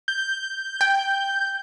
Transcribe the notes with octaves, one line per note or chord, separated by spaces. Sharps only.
G6
G5